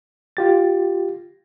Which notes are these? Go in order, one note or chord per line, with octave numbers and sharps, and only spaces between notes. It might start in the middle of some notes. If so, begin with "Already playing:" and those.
F4 G4 A6